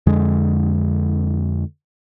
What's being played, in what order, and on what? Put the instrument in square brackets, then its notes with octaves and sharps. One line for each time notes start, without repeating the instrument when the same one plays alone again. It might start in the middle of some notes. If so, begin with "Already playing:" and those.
[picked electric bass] F2 D3 G#3